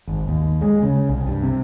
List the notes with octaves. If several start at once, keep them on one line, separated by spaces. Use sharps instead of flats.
G#1
D#2
G#3
C#3
C2
G2
C3